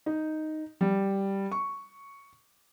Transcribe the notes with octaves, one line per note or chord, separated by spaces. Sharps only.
D#4
G3
C#6